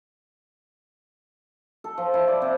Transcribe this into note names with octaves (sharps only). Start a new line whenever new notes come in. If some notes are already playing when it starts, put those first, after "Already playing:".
A4
F3
E4
D5
C3